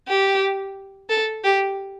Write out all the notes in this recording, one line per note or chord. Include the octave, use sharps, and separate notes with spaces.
G4
A4
G4